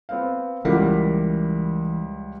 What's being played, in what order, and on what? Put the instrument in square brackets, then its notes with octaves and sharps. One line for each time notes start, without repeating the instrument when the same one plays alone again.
[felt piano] B3 C4 F5
[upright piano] C#2 G3 [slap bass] E3 [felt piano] G4 A#4 F#5